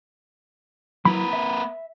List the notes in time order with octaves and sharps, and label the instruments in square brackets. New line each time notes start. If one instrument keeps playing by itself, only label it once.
[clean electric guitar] F#3 E4 [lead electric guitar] A#3 B4 [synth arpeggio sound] B5
[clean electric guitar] E5